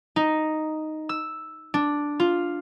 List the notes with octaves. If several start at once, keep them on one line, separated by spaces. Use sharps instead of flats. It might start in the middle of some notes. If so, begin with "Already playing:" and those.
D#4
E6
D4
F4